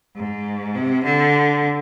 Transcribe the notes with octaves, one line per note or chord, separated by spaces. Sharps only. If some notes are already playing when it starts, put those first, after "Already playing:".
G#2
C3
D3